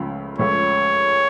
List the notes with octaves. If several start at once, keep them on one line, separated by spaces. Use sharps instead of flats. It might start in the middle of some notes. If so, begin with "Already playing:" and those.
Already playing: C#2 C#3 F3 A3
C#2 C#3 F3 A3 C#4 C#5